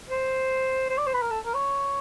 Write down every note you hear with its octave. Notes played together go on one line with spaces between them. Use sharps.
C5
C5
D5
C5
B4
A#4
A4
A#4
C#5